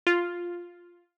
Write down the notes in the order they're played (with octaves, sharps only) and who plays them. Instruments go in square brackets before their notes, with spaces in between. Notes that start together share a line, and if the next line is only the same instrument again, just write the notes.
[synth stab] F4